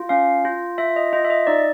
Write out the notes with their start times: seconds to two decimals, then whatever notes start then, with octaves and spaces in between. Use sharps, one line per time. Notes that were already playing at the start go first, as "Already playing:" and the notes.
Already playing: F4
0.09 C#4 F5
0.45 F4
0.78 F4 E5
0.96 D#5
1.13 F4 D#5
1.24 E5
1.30 D#5
1.47 D#4 D5